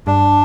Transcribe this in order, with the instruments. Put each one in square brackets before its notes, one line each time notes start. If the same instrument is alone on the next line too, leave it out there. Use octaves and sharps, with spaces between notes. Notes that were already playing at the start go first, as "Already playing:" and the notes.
[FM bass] G2 [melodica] D4